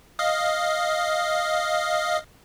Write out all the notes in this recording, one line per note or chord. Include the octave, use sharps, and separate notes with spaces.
D#5 F5